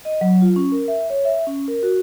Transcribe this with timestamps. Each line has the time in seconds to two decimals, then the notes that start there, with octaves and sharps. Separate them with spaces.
0.05 D#5
0.21 F#3
0.42 F4
0.56 C#4
0.72 A#4
0.88 E5
1.10 C#5
1.25 E5
1.47 C#4
1.68 A#4
1.83 F#4